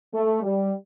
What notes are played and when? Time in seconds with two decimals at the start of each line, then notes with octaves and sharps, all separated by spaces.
0.14 A3
0.42 G3